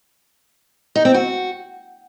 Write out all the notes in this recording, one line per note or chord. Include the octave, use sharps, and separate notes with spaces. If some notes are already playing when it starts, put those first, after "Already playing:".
D#4
C4
F#4